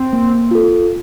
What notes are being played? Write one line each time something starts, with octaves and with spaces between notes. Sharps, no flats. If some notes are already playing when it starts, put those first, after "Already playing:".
Already playing: C4
A#3
F4 A4